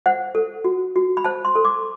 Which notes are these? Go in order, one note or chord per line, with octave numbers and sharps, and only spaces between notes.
C5 F#5
A4
F#4
F#4
B5
C5 A5
C6
A4
D6